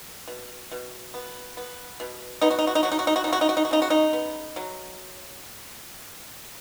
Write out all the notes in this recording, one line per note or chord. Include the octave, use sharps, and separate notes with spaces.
B2
B2
B3
B3
B2
B3 D#4
F#4
D#4
F#4
D#4
F#3 F#4
D#4
F#4
D#4
F#4
D#4
C#3
F#4
D#4
F#4
D#4
F#4
C#3 D#4
F#4
D#4
B3
F#3